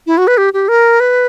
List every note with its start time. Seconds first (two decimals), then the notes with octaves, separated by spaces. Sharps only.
0.07 E4
0.18 F#4
0.27 B4
0.38 G4
0.54 G4
0.68 A#4
1.00 B4